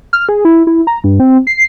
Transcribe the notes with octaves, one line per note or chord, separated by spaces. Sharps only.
F6
G#4
E4
E4
A#5
G2
C4
C7